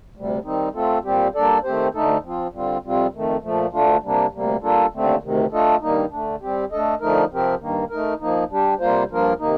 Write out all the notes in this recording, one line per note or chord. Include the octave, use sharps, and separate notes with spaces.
D2 C3 G3
D#3 G3 C4 D#4
A3 C4 F4 A4
A#2 G3 C4 G4
G3 A#3 D4 A4 D5
D#3 A3 C4 G4 C5
D2 D3 A3 D#4 A4
F3 C4 F4
D3 G3 C4 F4
F2 C3 G3 C4 F4
F2 D#3 A3
A#2 F3 A3
D2 D3 A3 D4 F4
C3 G3 A#3 D4
D2 C3 G3 A#3
G3 A#3 D4 F4 A4
D#2 D3 A3 C4
D2 C3 D#3
A3 D4 F4 A4 D#5
G2 D#3 G3 A#3 D#4
D3 A3 D4
G3 C4 G4
A3 D4 A4 D#5
D3 F3 A3 D#4 A#4
C3 F3 C4 G4 A#4
G2 D#3 A#3
A3 D#4 A#4
F3 A#3 D#4
G3 D4 G4
C3 G3 A#3 F4 C5
G2 F3 A#3 F4 A#4
C3 D#3 A#3 D#4